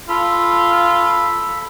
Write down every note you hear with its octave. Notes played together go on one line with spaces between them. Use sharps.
F4 A4 B5